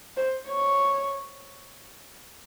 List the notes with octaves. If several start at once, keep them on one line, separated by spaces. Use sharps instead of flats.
C5
C#5